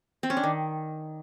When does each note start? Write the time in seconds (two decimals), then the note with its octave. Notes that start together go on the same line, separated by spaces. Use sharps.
0.23 C4
0.30 C#4
0.37 D4
0.43 D#3